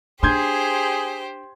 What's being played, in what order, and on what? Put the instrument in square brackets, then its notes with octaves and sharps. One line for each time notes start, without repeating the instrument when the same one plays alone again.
[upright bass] D4 [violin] G4 C5 [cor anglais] G#4 [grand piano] C6 G6 G#6